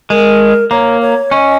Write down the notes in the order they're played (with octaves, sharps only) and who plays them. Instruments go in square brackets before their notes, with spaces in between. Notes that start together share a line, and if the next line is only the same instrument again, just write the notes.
[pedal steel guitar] G#3 [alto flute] A#4
[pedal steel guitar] A#3 [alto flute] C#5
[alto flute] C#5
[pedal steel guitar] C#4 [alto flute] D#5